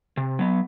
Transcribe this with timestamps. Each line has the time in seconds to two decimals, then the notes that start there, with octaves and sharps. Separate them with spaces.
0.17 C3
0.39 F#3 B3